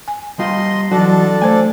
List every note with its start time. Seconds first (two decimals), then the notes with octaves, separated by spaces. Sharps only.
0.08 G#5
0.39 G3 F4 D#5 C6
0.91 E3 F#3 D4 F#4 A4
1.42 A3 C5 G#5